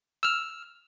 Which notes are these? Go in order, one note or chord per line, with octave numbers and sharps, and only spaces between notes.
E6 F6